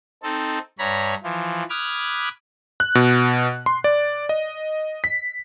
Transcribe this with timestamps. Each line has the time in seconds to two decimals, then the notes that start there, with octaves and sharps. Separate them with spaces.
0.23 C4 D#4 A4
0.79 G2 C#5 A#5 B5
1.23 E3 F3
1.70 B5 D6 D#6 F6 F#6 G#6
2.80 F#6
2.95 B2
3.66 C6
3.84 D5
4.29 D#5
5.04 B6